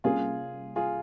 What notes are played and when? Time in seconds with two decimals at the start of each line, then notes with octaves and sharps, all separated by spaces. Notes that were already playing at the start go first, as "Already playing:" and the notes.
0.04 C3 G3 A#3 C#4 F4 G#4
0.76 F4 G#4